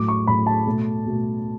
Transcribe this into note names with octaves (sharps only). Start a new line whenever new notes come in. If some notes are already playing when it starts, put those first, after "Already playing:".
Already playing: A2 F#3 A3 D6
C#6
A2 F#3 A3 B5
A5
B2 A3
B2 A3